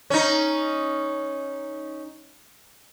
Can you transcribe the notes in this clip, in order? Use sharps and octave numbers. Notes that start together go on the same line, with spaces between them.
C#4 D#4